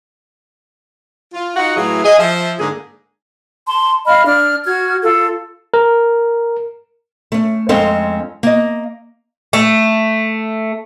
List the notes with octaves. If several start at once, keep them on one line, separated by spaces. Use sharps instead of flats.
F4
D#4 F4 F#4 F#5
A2 E3 F#3 E4 G#4 F5
G#4 D#5
F3 E5
G#2 D3 A#3 G#4
A5 C6
D#5 F5 B5 F6
D4 D5 F6
F#4 F6 G#6
F4 A4
A#4
A3 C#4
F2 G#3 C4 C#4 A4 F5
A#3 D#5
A3